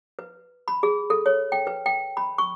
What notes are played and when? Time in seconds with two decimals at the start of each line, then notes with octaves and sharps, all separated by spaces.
0.19 B4
0.68 B5
0.83 G#4
1.10 A4
1.26 C#5
1.52 G5
1.67 B4
1.86 G5
2.17 B5
2.38 C#6